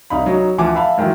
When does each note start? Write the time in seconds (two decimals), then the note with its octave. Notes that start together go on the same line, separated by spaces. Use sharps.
0.10 C2 D#4 F5 B5
0.26 F#3 C#4 D#4
0.58 D2 E3 F3 F#5 G#5 D6
0.75 E5 F5 A5 B5
0.98 G#2 D#3 E3 F#3 E4